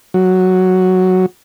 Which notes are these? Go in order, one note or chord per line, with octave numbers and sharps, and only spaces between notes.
F#3